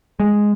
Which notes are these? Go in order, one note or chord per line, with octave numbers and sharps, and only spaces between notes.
G#3